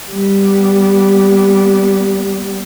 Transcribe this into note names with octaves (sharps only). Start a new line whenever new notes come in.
G3 B3